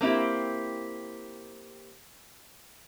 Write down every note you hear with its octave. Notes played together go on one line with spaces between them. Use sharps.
A#3 C4 E4 G4